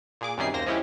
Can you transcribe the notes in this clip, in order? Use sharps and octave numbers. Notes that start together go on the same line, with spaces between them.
A#2 G#4 D6
F#2 C3 D#3 G3 G#4 C7
D#2 A#3 C5 A#6
F3 G#3 C#4 E4 G4